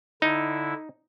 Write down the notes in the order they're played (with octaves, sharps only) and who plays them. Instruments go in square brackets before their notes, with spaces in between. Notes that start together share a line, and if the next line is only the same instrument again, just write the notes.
[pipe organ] D3 E4 [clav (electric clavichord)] D#4